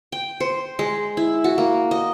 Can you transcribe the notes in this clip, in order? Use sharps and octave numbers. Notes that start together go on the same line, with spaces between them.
G5
C5
G#3
E4
F#4
A#3
D#5